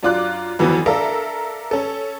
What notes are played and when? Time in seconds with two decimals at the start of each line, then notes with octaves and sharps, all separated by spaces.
0.03 F#2 D4 F4 D6 F#6
0.59 F2 E3 F#3 B3
0.86 D4 A4 A#4 E5 F5 A#5
1.71 C#4 A4